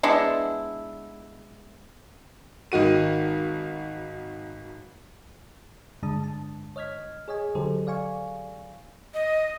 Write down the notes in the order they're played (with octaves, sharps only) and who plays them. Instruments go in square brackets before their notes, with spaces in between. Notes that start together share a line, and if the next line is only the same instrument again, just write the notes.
[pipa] G#3 B3 D4 E4
[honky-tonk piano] G#1 D#3 F#4 D#7
[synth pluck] G2 D3 G#3 D4 A5 D#6
A5
C#5 D#5 F6 G#6 B6
G#4 C#5 D#5 G#5
D3 F#3 G4 A4 C5
D5 F5 G#5 C#6
[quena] D#5